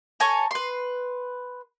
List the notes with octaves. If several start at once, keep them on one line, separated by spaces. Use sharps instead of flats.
A4 C#5 G#5 A#5
B4 C6